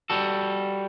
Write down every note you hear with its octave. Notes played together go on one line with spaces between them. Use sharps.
G3 F#4 A4